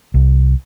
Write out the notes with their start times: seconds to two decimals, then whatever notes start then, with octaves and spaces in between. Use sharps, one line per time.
0.14 C2